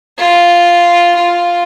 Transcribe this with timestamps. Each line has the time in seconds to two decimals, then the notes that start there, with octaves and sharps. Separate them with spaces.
0.18 F4
1.16 F4